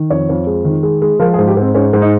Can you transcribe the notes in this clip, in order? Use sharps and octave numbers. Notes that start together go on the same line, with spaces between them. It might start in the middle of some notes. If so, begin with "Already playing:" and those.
Already playing: D#3
F2 C#5
F2
G#3
D#3
G#3
G#3
F3 A#4
G#4
G#2
G4
G#2 C4
G#2 C#4
G#2
D#4